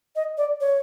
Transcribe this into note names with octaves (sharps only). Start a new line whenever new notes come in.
D#5
D5
C#5